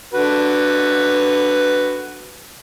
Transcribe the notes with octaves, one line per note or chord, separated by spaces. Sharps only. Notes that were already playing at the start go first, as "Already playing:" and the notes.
D3 F#4 B4